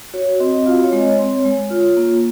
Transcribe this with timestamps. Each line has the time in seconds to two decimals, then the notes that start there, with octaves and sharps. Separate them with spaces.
0.14 F#4 C#5
0.40 C4 D#5
0.66 F4 F5
0.84 C#5
0.93 G#3 D#5
1.01 C#5
1.19 C4
1.45 G#3
1.70 F4
1.97 A#3